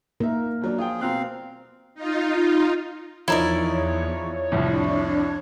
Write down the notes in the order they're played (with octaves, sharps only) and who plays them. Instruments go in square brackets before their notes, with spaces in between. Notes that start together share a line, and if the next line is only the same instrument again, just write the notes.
[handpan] A#3 A#4 [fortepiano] D#4 E5
[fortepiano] D#2 F#3 D4
[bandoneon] F3 G#4 [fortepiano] F4 G5
[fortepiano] B2 A#5 F#6 [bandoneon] C4 F5
[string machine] D#4 F4
[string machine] E2 [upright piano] F3 D#4 [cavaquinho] E4 A#4 D5 [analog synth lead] C#5
[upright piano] C2 F2 A2 [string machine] D4